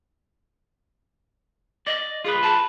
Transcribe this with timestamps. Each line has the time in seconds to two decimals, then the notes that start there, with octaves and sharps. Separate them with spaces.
1.87 D5 D#5
2.24 F4 G#4 B4
2.42 A5